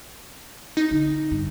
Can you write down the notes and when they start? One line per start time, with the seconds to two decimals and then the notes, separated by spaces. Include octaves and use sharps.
0.77 D#4
0.91 D3 C4
1.31 G2